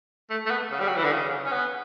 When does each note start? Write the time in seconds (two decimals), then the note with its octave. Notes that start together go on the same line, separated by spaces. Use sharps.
0.30 A3
0.46 A3
0.50 B3
0.71 C#3
0.80 G3
0.88 F#3
0.96 E3
1.04 D3
1.12 C#3
1.46 C#4
1.52 B3